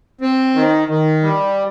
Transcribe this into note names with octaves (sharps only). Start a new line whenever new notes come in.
C4
D#3
D#3
G3